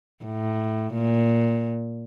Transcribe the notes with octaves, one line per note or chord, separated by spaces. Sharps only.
A2
A#2